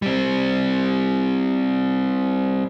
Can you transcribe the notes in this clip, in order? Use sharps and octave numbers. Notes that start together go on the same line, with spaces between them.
G3 C4